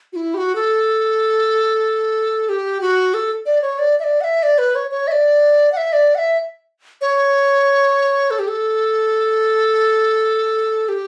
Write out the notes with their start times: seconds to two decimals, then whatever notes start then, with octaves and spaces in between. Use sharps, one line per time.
0.13 F#4
0.16 E4
0.34 G4
0.38 F#4
0.55 A4
2.49 G4
2.81 F#4
3.14 A4
3.46 D5
3.62 C#5
3.79 D5
4.00 E5
4.04 D5
4.21 F#5
4.24 E5
4.43 D5
4.58 B4
4.75 C#5
4.91 C#5
5.08 E5
5.12 D5
5.72 F#5
5.77 E5
5.93 D5
6.15 F#5
6.18 E5
7.01 C#5
8.31 A4
8.39 G4
8.48 A4
10.89 G4